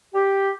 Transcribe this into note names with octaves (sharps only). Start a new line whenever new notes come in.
G4